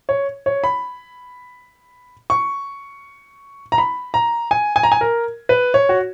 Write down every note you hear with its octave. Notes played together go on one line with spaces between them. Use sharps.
C#5
C#5
B5
C#6
A#5
B5
A#5
G#5
G#5
A#5
G#5
A#4
B4
C#5
F#4